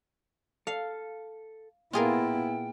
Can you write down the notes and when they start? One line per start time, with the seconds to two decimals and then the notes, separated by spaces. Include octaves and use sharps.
0.67 A4 F5
1.93 A#2 B3 E4 F4 G#4 A#4 G5